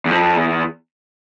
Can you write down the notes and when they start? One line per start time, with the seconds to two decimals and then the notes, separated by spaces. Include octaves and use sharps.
0.05 E2
0.11 F2
0.37 E2